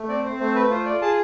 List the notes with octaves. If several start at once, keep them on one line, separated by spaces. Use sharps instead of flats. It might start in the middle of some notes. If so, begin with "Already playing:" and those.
Already playing: A3
C4 D5
C5
A3 C5
B4
F4 C5
D5
G#4 A5